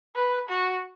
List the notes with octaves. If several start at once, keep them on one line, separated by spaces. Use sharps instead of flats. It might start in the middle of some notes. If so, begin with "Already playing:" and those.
B4
F#4